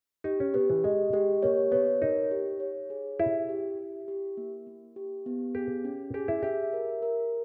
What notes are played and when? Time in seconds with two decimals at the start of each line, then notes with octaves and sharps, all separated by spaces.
0.24 D#4 G4
0.40 C#4
0.54 B3 G4
0.70 E3
0.84 G#3 D#5
1.13 G#3 G4
1.43 A#3 C#5
1.72 B3 C#5
2.02 D#4 A#4
2.31 G4
2.60 C#5
2.90 G#4
3.19 E4 G4
3.49 G4
3.78 G4
4.08 G4
4.37 A#3
4.67 A#3
4.96 G4
5.26 B3
5.55 G4 G#4
5.85 C#4
6.14 G4 G#4
6.28 E4
6.43 G4 E5
6.73 A#4
7.02 A#4